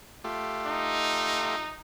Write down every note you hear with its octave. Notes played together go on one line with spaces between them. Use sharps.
A3 F4 G4
D#4